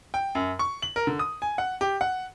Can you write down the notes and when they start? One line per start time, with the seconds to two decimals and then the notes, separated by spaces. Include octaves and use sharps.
0.14 G5
0.35 F#2
0.59 C#6
0.82 F#7
0.96 A#4
1.07 D3
1.19 D#6
1.42 G#5
1.58 F#5
1.81 G4
2.01 F#5